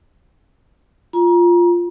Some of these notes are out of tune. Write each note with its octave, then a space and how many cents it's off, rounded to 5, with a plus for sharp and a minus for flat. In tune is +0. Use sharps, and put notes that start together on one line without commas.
F4 +0 A#5 +30